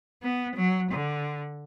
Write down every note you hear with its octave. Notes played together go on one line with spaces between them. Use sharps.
B3
F#3
D3